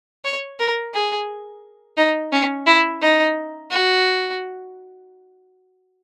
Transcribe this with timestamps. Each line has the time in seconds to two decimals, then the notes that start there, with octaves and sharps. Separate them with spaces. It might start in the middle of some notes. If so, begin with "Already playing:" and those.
0.24 C#5
0.59 A#4
0.94 G#4
1.97 D#4
2.32 C#4
2.66 E4
3.01 D#4
3.71 F#4